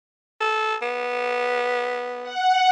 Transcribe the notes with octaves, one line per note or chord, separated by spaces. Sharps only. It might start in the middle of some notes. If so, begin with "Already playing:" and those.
A4
B3
F#5